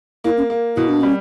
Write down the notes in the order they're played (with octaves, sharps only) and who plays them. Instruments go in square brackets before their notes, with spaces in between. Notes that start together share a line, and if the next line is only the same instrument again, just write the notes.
[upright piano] A#3 [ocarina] E4
[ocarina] C#4
[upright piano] A#3
[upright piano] B2 [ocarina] E4
[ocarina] D4
[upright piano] G3 [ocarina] C#4